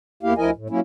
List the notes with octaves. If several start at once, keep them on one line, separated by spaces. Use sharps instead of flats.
E2 A#3 E4 G4 F5
D2 F3 E4 A#4 D#5 G#5
A2
F#3 A#3 C#4 E4